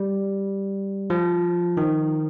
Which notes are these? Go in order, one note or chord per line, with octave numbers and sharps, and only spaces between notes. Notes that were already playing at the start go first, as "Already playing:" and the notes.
Already playing: G3
F3
D#3